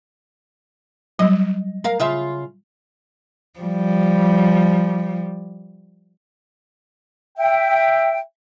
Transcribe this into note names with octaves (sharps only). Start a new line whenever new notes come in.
F#3 G3 D#5
A#4 F5
C#3 F4 E5
F3 G3
E5 G5